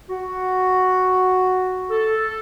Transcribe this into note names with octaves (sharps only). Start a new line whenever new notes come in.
F#4
A4